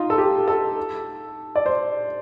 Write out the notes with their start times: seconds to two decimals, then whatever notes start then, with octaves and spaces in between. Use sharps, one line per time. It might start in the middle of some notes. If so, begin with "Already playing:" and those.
Already playing: D#4 F4
0.10 A4
0.18 G4
0.48 A4
1.56 D5
1.66 C5